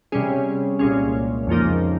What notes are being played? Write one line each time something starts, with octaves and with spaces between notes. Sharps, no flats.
C3 G3 C#4 G#4
C2 A#2 G#3 C#4
F2 C#3 F3 A#3 D#4